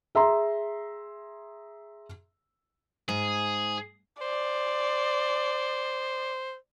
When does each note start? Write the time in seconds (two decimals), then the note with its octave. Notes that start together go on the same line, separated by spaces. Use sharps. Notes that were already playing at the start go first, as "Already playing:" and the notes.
0.15 G#4 E5 A#5 C6
3.09 G#2 G#4
4.21 C5 D5